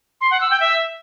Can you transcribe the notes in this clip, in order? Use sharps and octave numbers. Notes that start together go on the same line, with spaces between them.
C6
F#5
E6
G5
E5